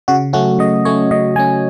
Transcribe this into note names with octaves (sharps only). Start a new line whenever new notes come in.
C#3 F#4
F#3 A3 C#4 F#4
C#3 D#5
F#3 A3 C#4 C#5
C#3 D#5
F#3 A3 C#4 G#5